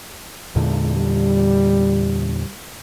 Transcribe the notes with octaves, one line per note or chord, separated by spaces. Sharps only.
E2 A#2 D3 G#3
G3